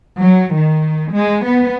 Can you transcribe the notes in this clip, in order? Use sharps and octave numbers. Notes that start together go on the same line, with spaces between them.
F#3
D#3
G#3
B3